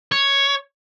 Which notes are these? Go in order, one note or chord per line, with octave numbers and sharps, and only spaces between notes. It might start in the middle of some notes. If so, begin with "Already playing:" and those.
C#5